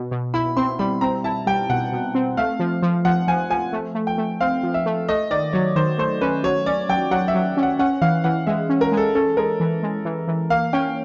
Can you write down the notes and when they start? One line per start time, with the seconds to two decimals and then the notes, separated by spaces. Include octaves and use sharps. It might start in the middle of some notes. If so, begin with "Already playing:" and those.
Already playing: B2
0.11 B2
0.34 E4 B5
0.57 C4 C6
0.79 G3 B5
1.01 C4 A#5
1.24 E4 A5
1.47 G3 G5
1.70 B2 F#5
1.92 B2
2.15 C4
2.37 A3 F5
2.59 F3
2.82 F3
3.05 F3 F#5
3.28 F3 G#5
3.50 F3 G#5
3.73 A3
3.95 A3
4.07 G5
4.18 A3
4.41 C4 F5
4.63 F3
4.74 E5
4.86 A3
5.09 A3 D#5
5.30 D#3 D5
5.53 F#3 C#5
5.76 D#3 C5
5.98 A3 C5
6.21 C#4 B4
6.44 F#3 C#5
6.66 C#4 D5
6.89 F#3 G5
7.11 F#3 F#5
7.28 E5
7.35 F#3
7.57 C#4
7.63 F#5
7.79 C#4 F#5
8.02 E3 F5
8.24 E3 F#5
8.47 G#3 E5
8.69 C#4
8.81 A#4
8.92 G#3
8.97 A4
9.15 C#4 A4
9.37 G#3 A#4
9.60 E3
9.83 G#3
10.05 E3
10.28 E3
10.50 A#3 F5
10.73 C#4 G5